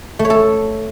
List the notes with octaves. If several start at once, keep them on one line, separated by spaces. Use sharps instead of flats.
A3
C#5
A4